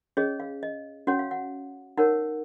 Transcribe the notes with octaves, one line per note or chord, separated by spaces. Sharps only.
C#4 G#4 C#5 D#5
F5
D#5
C#4 F#4 C#5 F#5
F5
F#5
D#4 A#4 C#5 F#5